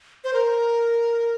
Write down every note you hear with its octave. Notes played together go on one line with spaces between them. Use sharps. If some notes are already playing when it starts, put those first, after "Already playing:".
C5
A#4